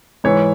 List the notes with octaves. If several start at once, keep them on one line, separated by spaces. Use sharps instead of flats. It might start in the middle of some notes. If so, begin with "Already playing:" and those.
G#2 E3 C#5